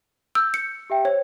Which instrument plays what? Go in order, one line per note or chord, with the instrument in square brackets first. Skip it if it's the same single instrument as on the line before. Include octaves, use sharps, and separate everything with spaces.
[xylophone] E6 [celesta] G6
[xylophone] C#7
[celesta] G4 E5 G5
[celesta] C5 [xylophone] C#5